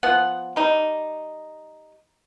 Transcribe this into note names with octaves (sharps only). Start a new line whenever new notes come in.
F3 B3 F#5
G3 D#4